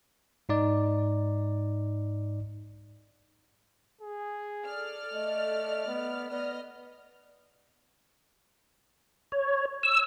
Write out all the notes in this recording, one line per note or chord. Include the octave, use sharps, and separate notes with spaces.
G#2 D#4 D5
G#4
A4 D5 F6
A3 D#5
B3
B3 D5 D#5 F6
C#5
E6